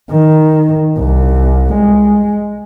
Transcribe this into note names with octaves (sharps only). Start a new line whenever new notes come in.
D#3
C2
G#3